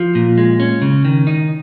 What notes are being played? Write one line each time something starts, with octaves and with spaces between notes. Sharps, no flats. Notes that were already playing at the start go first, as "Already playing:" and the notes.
Already playing: F3
A#2
G#3
C#4
C#3
D#3
D#4